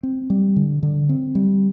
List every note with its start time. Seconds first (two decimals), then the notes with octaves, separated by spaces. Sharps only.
0.03 C4
0.30 G3
0.56 D3
0.83 D3
1.09 C4
1.35 G3